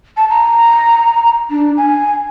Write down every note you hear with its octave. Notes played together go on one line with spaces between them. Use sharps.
A5
A#5
D4
G#5